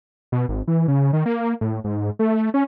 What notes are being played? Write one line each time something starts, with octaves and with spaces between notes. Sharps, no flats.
B2
G#1
E3
C#3
D#3
A#3
A2
G#2
A3
C#4